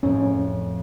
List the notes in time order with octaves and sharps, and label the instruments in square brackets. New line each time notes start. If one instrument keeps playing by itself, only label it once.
[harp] F2 A2 [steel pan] C#4